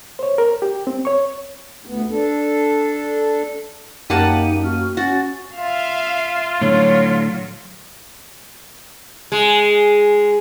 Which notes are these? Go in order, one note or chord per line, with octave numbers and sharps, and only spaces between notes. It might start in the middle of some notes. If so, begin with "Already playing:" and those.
C5 C#5
A#4
G4
C4
C#5 C#6
D2 B3
D4 A4
F#2 A#3 D#4 G4 F#5 A5 D#7
F#4 F6
C#4 F#4 A6
F4 E5 F5
A2 D3 F#3 C#5
G#3